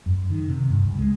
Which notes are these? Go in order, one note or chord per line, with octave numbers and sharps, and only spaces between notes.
F#2
D#3
C3
G2
C#2
G#3